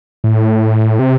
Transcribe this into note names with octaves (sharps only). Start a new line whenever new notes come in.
A2
C3